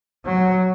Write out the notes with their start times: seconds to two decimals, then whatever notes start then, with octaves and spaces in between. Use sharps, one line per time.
0.25 F#3